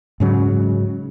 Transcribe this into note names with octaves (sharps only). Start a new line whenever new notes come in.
G#2 C#3 F#3